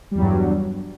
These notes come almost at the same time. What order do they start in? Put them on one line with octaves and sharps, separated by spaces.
G3 E2 F#3 G2